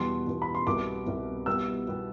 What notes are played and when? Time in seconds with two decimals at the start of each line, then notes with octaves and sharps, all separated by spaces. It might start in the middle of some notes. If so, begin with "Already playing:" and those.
Already playing: E2 B2 G3 B3 C6
0.26 E2 B2 G3 B3
0.42 B5
0.55 C6
0.67 C2 B2 G3 B3 D6
1.06 C2 B2 G3 B3
1.46 B2 G3 B3 E6
1.87 B2 G3 B3